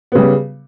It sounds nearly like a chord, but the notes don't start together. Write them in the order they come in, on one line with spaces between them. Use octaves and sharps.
B3 C#3 G3